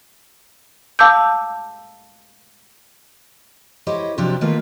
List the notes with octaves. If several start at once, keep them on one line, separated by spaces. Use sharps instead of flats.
F5 A5 D6 E6 G6
E4 G4 C5 C#5 D#5
C3 F3 F#3 D4 G4
D#3 E3 A3 A#3 F4 B4